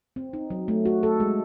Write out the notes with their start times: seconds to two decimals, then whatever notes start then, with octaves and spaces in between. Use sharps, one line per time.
0.16 C4
0.33 D#4
0.50 F#3
0.68 A3
0.86 F#4
1.03 A4
1.20 G#3